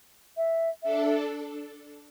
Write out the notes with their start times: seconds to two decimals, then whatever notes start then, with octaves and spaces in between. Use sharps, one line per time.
0.37 E5
0.83 D4 A4 E5